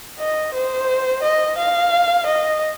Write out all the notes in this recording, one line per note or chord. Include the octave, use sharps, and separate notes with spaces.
D#5
C5
D#5
F5
D#5